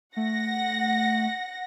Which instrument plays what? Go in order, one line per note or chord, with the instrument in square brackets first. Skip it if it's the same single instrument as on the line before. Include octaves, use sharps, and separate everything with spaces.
[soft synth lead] A3 [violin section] F#5 A#6